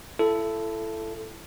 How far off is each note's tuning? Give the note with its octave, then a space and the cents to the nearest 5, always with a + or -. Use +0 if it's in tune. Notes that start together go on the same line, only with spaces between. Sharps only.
E4 +30 A4 +0